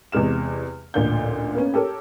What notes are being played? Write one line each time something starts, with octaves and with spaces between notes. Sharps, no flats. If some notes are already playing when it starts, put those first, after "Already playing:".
E2 C3 G#3 F6 E7
A1 D2 A#2 G6
A#3 B3 C#4
G4 A4 A#4 C#5